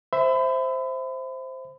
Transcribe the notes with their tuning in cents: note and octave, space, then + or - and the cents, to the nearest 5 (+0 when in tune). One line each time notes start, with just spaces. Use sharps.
C5 +0 E5 +0 B5 +35